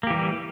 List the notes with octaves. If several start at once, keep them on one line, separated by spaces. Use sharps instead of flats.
E3 G3 A#3 G4